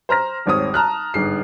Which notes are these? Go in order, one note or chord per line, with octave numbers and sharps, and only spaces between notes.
C5 A#5 F6 A#6
D#1 G#1 C4 C#5 D#6
A5 A#5 F6 F#6
G1 G#2 C7